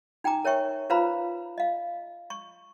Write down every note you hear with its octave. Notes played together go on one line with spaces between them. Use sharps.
D#4 G5 G#5 A#5 D6
A#4 C#5 E5 G5 C#6
F4 B4 C5 F5 A#5 B5
D#5 F5
C#6